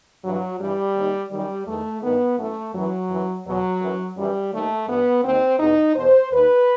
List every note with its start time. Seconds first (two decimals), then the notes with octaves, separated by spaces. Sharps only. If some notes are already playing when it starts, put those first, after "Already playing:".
0.24 G2 E3 F#3
0.60 G2 E3 G3
0.96 D#2 D#3
1.31 F#2 D#3 G3
1.67 E2 D#3 A3
2.02 G2 D#3 B3
2.38 F#2 E3 A3
2.74 F#2 E3 F#3
3.10 F#2 E3
3.46 E2 B2 F#3
3.81 F#2 E3
4.17 F#2 E3 G3
4.52 D#2 D#3 A3
4.88 G2 E3 B3
5.24 D#2 D#3 C4
5.60 E2 B2 D#4
5.95 E2 B2 C5
6.31 D#2 D#3 B4